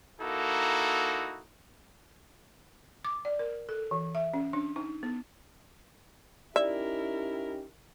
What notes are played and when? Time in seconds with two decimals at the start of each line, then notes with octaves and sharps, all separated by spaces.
0.20 A#3 D#4 E4 F#4 A4
3.05 D6
3.25 D5
3.39 A#4
3.69 A4
3.91 E3
4.15 E5
4.34 C#4
4.53 D4
4.76 D#4
5.03 B3
6.56 C#4 D#4 E4 G4 A#4 D5 E5